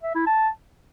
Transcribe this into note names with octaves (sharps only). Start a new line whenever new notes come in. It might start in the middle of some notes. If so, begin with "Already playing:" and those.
E5
E4
A5